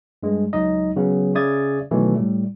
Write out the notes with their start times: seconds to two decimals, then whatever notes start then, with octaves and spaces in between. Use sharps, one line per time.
0.23 G2 G#3
0.53 C#2 F#3 D#4 D#5
0.96 C#3 F#3 B3
1.35 C#3 D5 E5 D#6 G#6 A6
1.91 B2 D#3 E3 F#3 A3
2.16 A2 G3